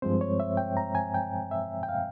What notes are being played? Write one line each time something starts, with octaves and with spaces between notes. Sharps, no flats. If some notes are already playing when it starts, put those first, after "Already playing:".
G2 F3 G#3 C4 C5
C#5
E5
G5
A#5
G#5
G5
E5
G5
F5